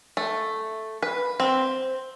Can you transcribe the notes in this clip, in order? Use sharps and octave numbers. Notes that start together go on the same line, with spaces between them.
A3
B4
C4